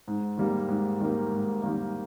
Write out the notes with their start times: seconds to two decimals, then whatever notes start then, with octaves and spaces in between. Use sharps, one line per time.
0.08 G#2
0.37 D#3 G3 A#3
0.68 G#2
1.00 D#3 G3 A#3
1.32 G#2
1.62 D#3 G3 A#3